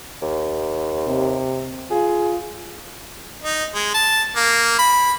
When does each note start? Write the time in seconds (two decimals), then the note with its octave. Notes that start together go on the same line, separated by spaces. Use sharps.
0.22 D#2
1.08 C3
1.91 F4 G#4
3.43 D#4
3.74 G#3
3.94 A5
4.36 A#3
4.79 B5